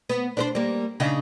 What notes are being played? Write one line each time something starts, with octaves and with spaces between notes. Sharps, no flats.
B3
D4 B4 C5
G3 A#3
C#3 D4 D#4